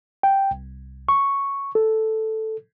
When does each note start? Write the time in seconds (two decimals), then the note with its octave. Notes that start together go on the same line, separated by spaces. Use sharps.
0.23 G5
0.51 C2
1.09 C#6
1.75 A4